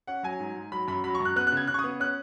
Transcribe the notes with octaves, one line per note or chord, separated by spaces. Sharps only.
C#4 F#5
F#3 G#5
G#2
G#2
F#3 B5
F#2 B5
F#3 B5
C#6
F#2 F#6
B3 F#6
F#6
C#3 G#6
C#3 F#6
C#6
D#6
B3
C#4 F#6